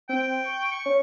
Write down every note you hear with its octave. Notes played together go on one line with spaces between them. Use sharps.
C4 G5
C#6
C#6
C#4